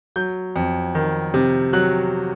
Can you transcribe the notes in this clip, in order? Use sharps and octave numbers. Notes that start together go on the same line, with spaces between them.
F#3 G6
F2
D#3
C3
F#3 F#6